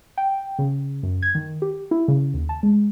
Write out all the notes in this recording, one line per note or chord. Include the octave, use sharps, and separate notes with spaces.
G5
C#3
F#2
G#6
D#3
G4
E4
C#3
D#2
A5
G#3